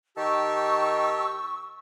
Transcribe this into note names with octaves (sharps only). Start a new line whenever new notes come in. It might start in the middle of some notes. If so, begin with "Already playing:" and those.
D#3 G4 A5 C#6 E6